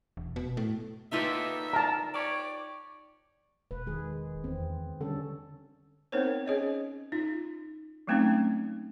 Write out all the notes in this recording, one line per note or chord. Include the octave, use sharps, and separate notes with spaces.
E1
B2
A2
A#3 D#4 F4 G4 A4 B4 E5
A#4 A5 A#5
G4 C#5 D5
E1 B4
D#3 G#3 G#4
E2 C4
D3 G3 C#4 A4
B3 C4 D#4 A#4 C5 C#5
C#4 G#4 C#5 D#5
D#4 F4
F#3 G#3 A3 C4 C#4 D#4